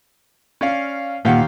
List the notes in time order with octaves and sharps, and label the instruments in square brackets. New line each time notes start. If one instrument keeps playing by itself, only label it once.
[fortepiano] C#4 D5 F5
[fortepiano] D#2 G4 F5 [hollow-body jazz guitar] A#2 A#3 F#5